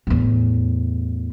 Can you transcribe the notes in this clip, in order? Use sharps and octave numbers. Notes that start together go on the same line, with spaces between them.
E2 A2